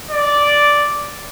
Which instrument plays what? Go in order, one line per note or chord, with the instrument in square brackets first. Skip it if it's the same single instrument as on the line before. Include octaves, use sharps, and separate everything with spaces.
[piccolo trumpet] D5